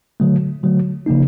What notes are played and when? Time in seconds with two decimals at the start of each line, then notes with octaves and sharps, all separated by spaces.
0.20 D3 F#3 A3
0.63 D3 F#3 A3
1.06 C#3 F3 A#3 D#4